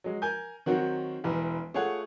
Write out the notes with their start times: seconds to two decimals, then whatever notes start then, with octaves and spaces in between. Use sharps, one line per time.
0.04 F#3 G#3
0.22 A#4 G#5 G6
0.66 D#3 F#3 C4 F#4 A#4
1.24 E1 E3
1.74 A3 F4 G#4 C#5 F#5